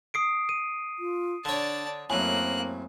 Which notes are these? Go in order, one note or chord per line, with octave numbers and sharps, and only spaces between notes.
D#6 C7 D7
D#7
F4
D3 D4 C#5 D5 A5
F#2 A2 A#3 C4 G#5 F#6